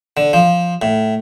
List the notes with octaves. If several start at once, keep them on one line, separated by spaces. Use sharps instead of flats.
D3
F3
A2